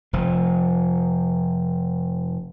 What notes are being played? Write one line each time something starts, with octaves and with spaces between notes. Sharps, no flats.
F1 F3